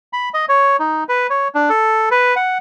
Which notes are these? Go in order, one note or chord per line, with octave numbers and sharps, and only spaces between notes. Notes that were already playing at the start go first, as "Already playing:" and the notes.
B5
D#5
C#5
D#4
B4
C#5
D4
A4
B4
F#5